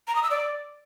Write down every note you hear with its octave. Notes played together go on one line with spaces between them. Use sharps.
A#5
D#6
E6
D5